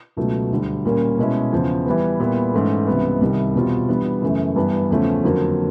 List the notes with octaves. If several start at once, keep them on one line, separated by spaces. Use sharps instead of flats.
C#2 B2 F#3 A3
D2 D3 G3
A#2 G3 A#3 C#4
B2 G#3 C#4 E4
E2 C#3 F3
E3 G3 B3
A#2 G3 B3 E4
G#2 E3 A3 C#4
C#2 C3 E3 G3 B3
C2 C3 D#3 G3
E2 B2 G3 C4 F4
E3 G3 B3 D4
F#2 C#3 E3 A3
G2 E3 G3 B3
E2 C#3 F3 A3 C#4
F2 D3 F#3 A#3